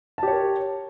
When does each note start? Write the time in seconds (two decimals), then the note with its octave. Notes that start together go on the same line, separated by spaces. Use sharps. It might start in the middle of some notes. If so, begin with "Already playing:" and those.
0.18 A5
0.23 G4
0.28 C#5
0.32 A#4